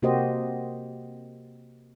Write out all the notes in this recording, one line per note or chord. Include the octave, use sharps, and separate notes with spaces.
C3 A#3 F#4 G4 C5 D#5